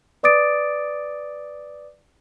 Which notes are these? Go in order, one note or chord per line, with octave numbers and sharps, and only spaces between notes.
B4 D5 D6 D#6 A6 D7